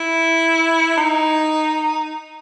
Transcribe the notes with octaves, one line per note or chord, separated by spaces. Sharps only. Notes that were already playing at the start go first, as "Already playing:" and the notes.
Already playing: E4
D#4